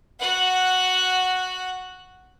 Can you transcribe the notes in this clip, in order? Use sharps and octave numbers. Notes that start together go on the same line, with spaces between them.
F#4 F#5